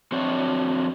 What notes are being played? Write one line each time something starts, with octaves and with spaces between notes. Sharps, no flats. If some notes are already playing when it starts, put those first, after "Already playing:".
F2 C4 D4 F#4 C#5